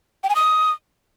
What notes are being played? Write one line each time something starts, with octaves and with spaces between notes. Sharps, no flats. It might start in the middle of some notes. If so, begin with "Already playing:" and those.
G5
G#5
D#6